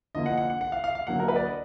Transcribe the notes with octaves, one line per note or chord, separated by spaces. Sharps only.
D3 F3 A#3 D#5
F#5
F#5
F#5
F#5
F5
F5
F5
D3 F#3 A#3 F#5
A#4
B4
D5
D#5